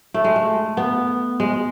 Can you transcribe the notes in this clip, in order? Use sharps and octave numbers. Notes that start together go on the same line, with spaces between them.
A3
G#3
A3
B3
G#3